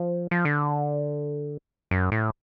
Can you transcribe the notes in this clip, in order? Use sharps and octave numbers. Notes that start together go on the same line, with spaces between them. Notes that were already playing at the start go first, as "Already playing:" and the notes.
Already playing: F3
F3
D3
F#2
A2